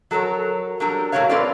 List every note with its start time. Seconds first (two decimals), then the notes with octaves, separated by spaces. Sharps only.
0.11 F#3 A4 A#4 C#5
0.80 F#3 G3 D4 A4 A#4
1.12 A2 G#3 F#4 A#4 C#5 F5
1.30 C4 F4 A4 B4 D5